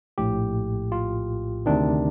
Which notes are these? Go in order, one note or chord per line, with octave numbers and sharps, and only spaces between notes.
A#1 A2 G4
F4
D2 C3 D#3 D4